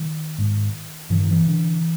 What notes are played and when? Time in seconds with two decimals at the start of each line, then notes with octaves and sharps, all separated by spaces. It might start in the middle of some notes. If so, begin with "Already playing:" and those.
Already playing: D#3
0.38 G#2
1.10 G2 E3
1.20 D#3
1.31 E3
1.47 D3